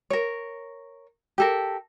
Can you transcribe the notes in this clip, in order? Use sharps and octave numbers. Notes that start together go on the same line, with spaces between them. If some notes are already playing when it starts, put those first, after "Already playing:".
A#4 C#5
G4 A4 A#4